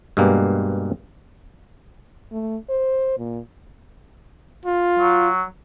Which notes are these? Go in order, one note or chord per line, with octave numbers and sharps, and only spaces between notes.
G2 B2 G3 G#3 A#3
A3
C5
A#2
F4
F#3